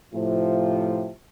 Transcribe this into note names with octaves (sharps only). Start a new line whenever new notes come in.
A2 C3 F3